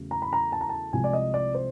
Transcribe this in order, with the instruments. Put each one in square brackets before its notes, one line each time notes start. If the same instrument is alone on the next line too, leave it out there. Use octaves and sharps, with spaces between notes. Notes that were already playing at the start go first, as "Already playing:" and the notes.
Already playing: [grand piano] E2 C#3 F#3 A3
A#5
B5
A#5
A5
A#5
A5
C2 C3 F3 G#3 G#5
D5
D#5
D5
C5